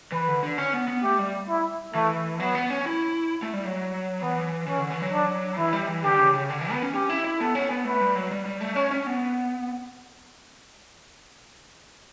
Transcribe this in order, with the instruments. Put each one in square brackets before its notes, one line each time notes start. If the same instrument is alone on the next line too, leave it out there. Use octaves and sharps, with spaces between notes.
[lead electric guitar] E3 [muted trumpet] B4
[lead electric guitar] D3
D3
C#4
B3
B3
[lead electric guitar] A3 [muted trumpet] G4
[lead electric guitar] G3
[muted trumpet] E4
[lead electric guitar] E3 [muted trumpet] A3
[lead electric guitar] F#3 [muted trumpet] B3
[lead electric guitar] B3
C#4
E4
A3
G3
F#3
[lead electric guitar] E3 [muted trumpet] B3
[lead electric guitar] E3 [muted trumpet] C#4
[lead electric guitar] D3
E3
F#3
[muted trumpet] D4
[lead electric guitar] E3 [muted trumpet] E4
[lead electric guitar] G3
E3
[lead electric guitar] D3 [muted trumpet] G4
[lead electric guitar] C#3
C#3
D3
E3
B3
C#4
[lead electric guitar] C#4 [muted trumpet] G4
[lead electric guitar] E4
E4
[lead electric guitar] B3 [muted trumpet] A4
[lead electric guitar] C#4
B3
[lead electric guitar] A3 [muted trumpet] B4
[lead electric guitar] G3
F#3
G3
G3
A3
[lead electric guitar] C#4 [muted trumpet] C#5
[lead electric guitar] C#4
B3